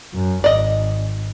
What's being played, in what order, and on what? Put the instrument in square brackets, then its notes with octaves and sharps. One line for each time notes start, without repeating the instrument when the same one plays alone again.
[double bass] F#2
[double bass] G#1 [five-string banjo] D5 D#5